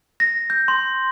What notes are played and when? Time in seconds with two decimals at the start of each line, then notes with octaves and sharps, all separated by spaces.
0.20 A#6
0.50 G6
0.68 C6